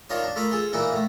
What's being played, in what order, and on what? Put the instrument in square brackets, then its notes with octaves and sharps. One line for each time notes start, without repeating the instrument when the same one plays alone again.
[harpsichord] D#3 D4 F4 A#4 C#5 D#6
D4
A3 F4 A#4 B5 D6 D#6
F4 G#4 A4
A#2 E3 A#3 D#4 E4
A2 A3